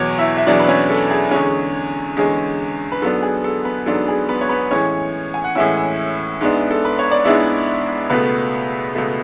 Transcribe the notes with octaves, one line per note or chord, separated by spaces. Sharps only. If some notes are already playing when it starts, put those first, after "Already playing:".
Already playing: E2 B2 F#3 C#5 C#6 D6
E4 E5
E5
E2 B2 F#3 D4 D5
B4
C#4 C#5
A4
G#4
E2 D3 G#3 C#4
E2 D3 G#3 C#4
B4
G#2 F#3 B3 D4 A4
G#4
A4
B3 B4
G#2 F#3 B3 D4 A4
G#4
B3 B4
C#5
B3 B4
A2 E3 G#3 C#4 C#5
G#5
F#5
A2 E3 G#3 C#4 E4 E5
G#2 G#3 B3 D4
A4
B4
C#5
D5
G#2 G#3 B3 D4 E4 E5
C#2 B2 A3 B3 B4
C#2 B2 A3